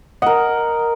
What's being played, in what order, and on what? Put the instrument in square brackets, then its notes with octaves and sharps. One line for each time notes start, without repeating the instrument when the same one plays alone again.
[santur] A#4 D#5 [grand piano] F#5